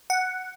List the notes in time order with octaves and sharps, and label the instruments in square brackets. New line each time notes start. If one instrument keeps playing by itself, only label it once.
[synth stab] F#5